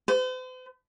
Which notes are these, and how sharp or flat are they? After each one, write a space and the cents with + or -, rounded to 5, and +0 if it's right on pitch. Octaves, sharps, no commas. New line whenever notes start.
C5 -45